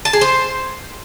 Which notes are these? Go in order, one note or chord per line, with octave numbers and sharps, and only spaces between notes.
A5
G#4
C5